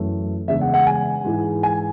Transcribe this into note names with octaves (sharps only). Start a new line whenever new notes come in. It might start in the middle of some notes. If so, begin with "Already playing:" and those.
Already playing: F#2 E3 A3
E2 C#3 G#3 D4 E5
F#5
F#5
G#5
G#2 E3 G#3
G#5